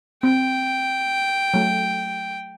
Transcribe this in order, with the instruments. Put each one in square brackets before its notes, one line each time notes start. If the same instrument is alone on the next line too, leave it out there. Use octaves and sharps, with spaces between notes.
[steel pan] C4 [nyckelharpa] G5
[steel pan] F#3 A3